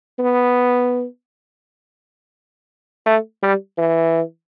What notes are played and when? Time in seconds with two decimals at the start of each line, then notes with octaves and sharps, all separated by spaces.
0.19 B3
3.06 A3
3.43 G3
3.78 E3